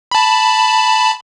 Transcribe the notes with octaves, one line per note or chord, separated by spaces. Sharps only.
A5 B5